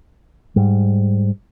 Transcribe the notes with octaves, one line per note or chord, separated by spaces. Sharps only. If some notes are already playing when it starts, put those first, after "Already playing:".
G#2 G3